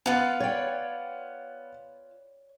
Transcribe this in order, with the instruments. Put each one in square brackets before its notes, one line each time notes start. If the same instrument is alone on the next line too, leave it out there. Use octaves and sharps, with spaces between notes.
[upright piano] B3 F#5 [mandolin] F4 B4
[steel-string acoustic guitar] C#5 D5 G5